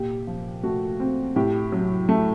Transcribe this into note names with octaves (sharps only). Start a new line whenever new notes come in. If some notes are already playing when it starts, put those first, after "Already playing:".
Already playing: A#2 G4
F3
A3 F#4
C4
A2 G4
F#3
A3